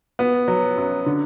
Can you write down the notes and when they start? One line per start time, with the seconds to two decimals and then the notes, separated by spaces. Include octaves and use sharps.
0.19 B3
0.48 F#3
0.78 F#2
1.06 D3